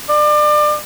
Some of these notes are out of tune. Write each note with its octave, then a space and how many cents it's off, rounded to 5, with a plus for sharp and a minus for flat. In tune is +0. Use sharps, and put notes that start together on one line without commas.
D5 +30